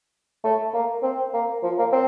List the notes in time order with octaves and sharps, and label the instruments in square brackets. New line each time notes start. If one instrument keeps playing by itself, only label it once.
[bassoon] A3
A#3
C4
A#3
F3
A#3
C4